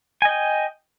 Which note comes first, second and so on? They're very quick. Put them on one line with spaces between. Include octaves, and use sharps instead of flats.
G#5 D#5 G5